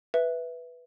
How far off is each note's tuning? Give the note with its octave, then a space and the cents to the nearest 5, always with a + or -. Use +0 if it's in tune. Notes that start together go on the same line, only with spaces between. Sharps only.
B4 +0 E5 +0